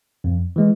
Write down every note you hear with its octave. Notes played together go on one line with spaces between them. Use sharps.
F2
E3 G#3